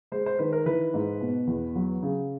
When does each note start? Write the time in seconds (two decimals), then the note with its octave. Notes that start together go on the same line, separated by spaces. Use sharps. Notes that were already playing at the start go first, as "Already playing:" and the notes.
0.12 G#3 C5
0.26 C5
0.39 D#3 B4
0.53 A#4
0.66 E3 B4
0.94 G#2
1.21 B2
1.47 E2
1.75 F#3
2.03 C#3